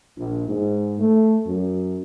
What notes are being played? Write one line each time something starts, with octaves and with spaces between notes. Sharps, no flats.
A#1
G#2
A3
F#2